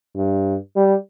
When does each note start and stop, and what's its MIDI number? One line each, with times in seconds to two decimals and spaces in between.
0.16 0.56 43
0.76 0.95 55